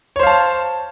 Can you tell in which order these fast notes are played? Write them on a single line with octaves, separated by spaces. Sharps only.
C#5 C5 F5 A5